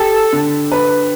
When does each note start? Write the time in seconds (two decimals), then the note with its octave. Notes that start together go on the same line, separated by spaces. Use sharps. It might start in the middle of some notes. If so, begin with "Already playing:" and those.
Already playing: G4 A4
0.33 D3
0.72 B4